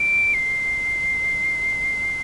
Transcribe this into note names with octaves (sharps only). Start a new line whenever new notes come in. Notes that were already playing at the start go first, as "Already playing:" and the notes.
Already playing: D7
C7